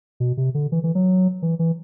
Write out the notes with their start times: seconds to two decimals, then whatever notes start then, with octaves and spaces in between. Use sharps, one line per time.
0.20 B2
0.37 C3
0.55 D3
0.72 E3
0.84 E3
0.95 F#3
1.42 E3
1.59 E3